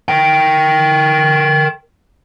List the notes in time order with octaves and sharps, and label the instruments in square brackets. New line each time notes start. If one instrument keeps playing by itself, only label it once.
[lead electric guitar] A#4 G5